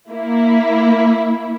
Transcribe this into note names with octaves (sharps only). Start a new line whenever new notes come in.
A#3 E4